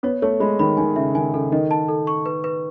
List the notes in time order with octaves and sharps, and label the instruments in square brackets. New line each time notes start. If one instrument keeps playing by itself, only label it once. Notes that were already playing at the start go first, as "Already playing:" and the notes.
[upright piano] B3 [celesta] C#5
[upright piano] A3 [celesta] C#5
[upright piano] G#3 [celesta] B5
[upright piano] D#3 [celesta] B5
[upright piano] D#3 [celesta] G#5
[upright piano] C#3 [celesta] E5
[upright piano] D#3 [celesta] G#5
[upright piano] C#3 [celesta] A4
[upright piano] D#3 [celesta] D#5
[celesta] A5
A4
C#6
B4
B4